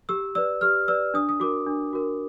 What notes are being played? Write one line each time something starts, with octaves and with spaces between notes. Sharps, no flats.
G4 E6
B4 D5 E6
G4 F6
B4 D5 E6
D4 D#6
D#6
F#4 A#4 D6
D4
F#4 A#4